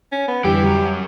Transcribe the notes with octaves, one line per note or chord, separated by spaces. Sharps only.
C#4
B3
F2 D3 E3 G3 G4
F#2 F#3
F#5